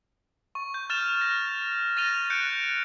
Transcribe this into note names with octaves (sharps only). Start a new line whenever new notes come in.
C#6
G6
F6 A6 E7 F7
A#6
A6 A#6 D#7 F7 G7
F#6 G6 C#7 D7